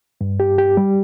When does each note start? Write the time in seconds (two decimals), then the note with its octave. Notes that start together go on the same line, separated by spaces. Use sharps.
0.21 G2
0.40 G4
0.58 G4
0.77 G3